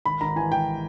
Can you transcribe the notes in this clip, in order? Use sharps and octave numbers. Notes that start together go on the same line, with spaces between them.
G#1 B5
G#1 A#5
E3 G#5
G#1 G5